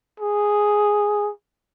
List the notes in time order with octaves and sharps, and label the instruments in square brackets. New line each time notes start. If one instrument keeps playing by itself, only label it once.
[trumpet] G#4